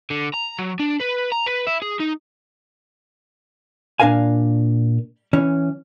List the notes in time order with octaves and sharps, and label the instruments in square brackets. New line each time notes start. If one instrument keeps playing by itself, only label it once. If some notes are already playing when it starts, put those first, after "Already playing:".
[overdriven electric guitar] D3
A#5
F#3
D4
B4
A#5
B4
E4
G#4
D#4
[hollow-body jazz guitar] A#2 D4 A#4 F5 G#5
E3 C#4